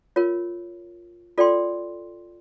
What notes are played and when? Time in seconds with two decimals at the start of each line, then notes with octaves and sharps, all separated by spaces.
0.16 F4 A#4 C#5
1.38 F4 A4 D5 G5 C6